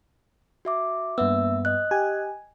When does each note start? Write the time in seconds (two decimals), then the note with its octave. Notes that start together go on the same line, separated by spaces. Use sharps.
0.65 F#4 E5 D6
1.18 G2 A#3 B3 E5 E6
1.65 D#5 F#6
1.91 G4 G#5